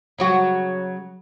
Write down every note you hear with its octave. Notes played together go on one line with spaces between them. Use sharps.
C#3 F#3 F#4